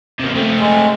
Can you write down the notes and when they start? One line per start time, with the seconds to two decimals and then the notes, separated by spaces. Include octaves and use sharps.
0.19 C3 A#3
0.35 A3 C4
0.60 G#3